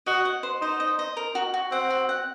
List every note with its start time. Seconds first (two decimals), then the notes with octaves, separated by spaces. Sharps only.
0.06 F#4 D#5
0.25 F#5
0.43 C5
0.62 D#4 C5
0.80 D#5
0.99 D#5
1.17 A#4
1.35 F#4
1.54 F#4
1.72 C4 F#5
1.90 F#4
2.09 F#5